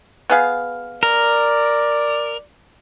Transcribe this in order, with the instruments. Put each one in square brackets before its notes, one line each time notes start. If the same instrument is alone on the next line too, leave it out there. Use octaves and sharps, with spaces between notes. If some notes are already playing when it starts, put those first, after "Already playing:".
[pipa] B3 G#4 F5
[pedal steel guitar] A#4 [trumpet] D5